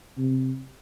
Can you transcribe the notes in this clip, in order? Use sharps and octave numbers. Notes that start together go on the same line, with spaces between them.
C3